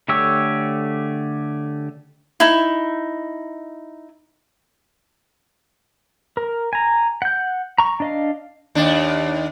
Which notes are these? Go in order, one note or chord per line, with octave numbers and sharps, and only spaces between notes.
D3 A3 G4 C#5 E6
D#4 E4
A#4
G#5 A#5
F#5 G6
A#5 C#6
D4 D#5 F5
D#2 D4